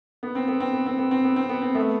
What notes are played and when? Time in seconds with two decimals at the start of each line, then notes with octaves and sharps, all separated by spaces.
0.23 B3
0.35 C4
0.48 B3
0.60 C4
0.73 B3
0.86 C4
0.98 B3
1.11 C4
1.24 B3
1.36 C4
1.49 B3
1.62 C4
1.75 A3 B3